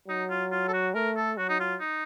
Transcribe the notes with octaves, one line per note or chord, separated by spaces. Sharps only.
F#3 D#4
F4
F4
A4
F#4
A3 A#4
A4
F#3 F#4
D#4
F4
D#4